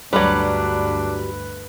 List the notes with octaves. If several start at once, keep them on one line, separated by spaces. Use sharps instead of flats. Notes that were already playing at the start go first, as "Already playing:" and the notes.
D2 G2 F#3 G3 D4 B4